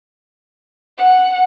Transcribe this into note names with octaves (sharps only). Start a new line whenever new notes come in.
F#5